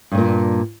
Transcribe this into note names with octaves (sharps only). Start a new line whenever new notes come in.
G2 A#2 C#3